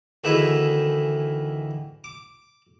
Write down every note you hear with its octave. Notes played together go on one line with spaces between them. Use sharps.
D2 D#3 E3 E4 G#4 B4
D6